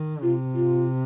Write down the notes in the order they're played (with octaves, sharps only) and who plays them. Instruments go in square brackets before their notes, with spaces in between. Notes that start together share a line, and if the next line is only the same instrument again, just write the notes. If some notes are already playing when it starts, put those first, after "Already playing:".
Already playing: [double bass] D#3
[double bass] C3 [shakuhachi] F4
[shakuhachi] F4